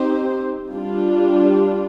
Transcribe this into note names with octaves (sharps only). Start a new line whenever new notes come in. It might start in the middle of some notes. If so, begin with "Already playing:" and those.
Already playing: C4 D#4 G4 C5
G3 D4 F4